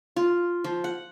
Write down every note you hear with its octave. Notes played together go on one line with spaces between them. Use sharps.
F4
F3
F#5